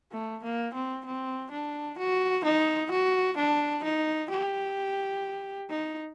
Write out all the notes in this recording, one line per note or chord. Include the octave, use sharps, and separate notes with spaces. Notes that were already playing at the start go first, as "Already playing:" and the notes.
A3
A#3
C4
C4
D4
F#4
D#4
F#4
D4
D#4
G4
D#4